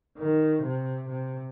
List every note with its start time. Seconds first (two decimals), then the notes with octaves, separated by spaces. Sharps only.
0.17 D#3
0.63 C3
1.09 C3